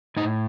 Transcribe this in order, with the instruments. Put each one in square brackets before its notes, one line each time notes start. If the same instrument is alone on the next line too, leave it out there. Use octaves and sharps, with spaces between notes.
[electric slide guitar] A2 D#4